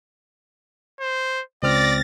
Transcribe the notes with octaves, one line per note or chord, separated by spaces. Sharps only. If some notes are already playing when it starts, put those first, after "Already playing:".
C5
C#2 C4 D5 F6 A6 A#6